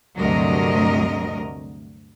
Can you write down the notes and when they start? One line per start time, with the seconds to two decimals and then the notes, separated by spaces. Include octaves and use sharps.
0.17 D2 G2 C3 F#3 A#4 D#5